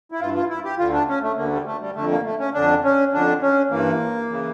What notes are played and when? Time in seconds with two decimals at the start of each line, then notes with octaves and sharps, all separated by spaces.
0.12 E4
0.20 G2 E3 F4
0.35 F4
0.49 E4
0.65 G4
0.78 D2 D3 F4
0.93 D4
1.09 C#4
1.22 A3
1.37 D2 D3 A#3
1.52 G3
1.67 A3
1.81 G3
1.95 F2 D3 A3
2.11 A#3
2.25 A3
2.39 C#4
2.54 F2 D3 D4
2.84 C#4
3.13 F2 D3 D4
3.42 C#4
3.70 G2 E3 A#3
4.30 C#3 E3